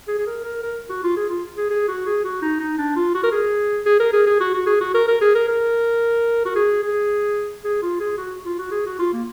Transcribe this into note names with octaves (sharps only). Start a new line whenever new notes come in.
G#4
G#4
A#4
A#4
A#4
F#4
F4
G#4
F4
G#4
G#4
F#4
G#4
F#4
D#4
D#4
D4
F4
F#4
A#4
G#4
G#4
A#4
G#4
G#4
F#4
F#4
G#4
F#4
A#4
A#4
G#4
A#4
A#4
F#4
G#4
G#4
G#4
F4
G#4
F#4
F4
F#4
G#4
F#4
F4
A#3